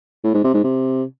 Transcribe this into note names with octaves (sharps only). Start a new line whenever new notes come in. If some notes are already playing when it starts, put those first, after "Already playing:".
A2
G#2
C3
G#2
C3